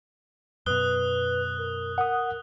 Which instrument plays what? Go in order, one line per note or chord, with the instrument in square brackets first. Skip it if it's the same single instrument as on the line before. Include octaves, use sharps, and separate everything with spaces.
[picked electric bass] F#2 B2 [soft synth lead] B4 [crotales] D#6 F#6 G7
[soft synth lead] A#4
[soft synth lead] A#4 [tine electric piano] F#5 D#6